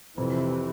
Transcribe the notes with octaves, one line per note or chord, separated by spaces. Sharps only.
F2 C3 E3